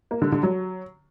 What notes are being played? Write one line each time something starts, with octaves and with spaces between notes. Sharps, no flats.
A#3
D3
D3
F#3